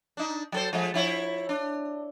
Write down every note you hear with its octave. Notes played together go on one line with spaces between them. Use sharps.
D4 D#4
F#3 A4 C5
F3 G#3 A3
F3 E4 C#5
D4